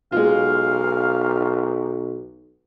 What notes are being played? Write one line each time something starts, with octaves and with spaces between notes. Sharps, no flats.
B1 G#3 F4 F5